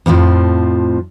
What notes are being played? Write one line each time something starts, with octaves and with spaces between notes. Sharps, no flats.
F2 A2 E3 F3